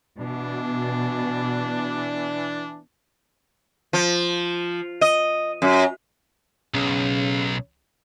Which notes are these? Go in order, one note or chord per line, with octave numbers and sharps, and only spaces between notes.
B2 E3 D4
F3
D#5
F#2
B1 C#3